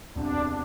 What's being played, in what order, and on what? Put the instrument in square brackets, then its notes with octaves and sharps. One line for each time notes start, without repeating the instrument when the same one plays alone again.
[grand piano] E1 E2 C3 [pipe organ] D4